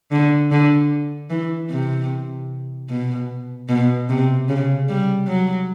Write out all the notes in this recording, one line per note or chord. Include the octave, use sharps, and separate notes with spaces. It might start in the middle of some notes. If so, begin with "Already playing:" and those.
D3
D3
E3
C3
B2
B2
C3
C#3
G3
F#3